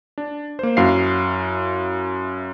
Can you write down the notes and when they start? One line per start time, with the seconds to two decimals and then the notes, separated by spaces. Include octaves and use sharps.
0.18 D4
0.59 A#3 C5
0.77 F#2 E4 F#4 F5 C7